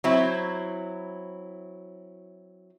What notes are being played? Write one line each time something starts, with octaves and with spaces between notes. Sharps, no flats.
F#3 C4 E4